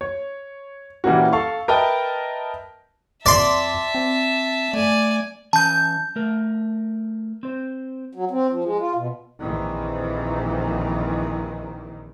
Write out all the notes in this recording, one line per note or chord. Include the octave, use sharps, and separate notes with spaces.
C#5
A#2 E3 G3 A#3 C#4 F#4
A4 F5 C#6
A#4 B4 D#5 E5 G5 A5
F2 D5 E5 A5 C6
C4
A3 D5 G#5
E3 C#4 G#5 A5 G6
A3 A#4
C4 C5
F#3
C4
F3
G#3
F4
B2
A#1 F2 A#2 D#3 E3